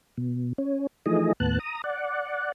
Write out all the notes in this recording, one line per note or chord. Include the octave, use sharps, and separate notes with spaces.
B2
C#4
E3 F3 A3 D#4 G#4 D#5
D#2 A2 B3 A5 F#6
A#5 D#6
D5 F#5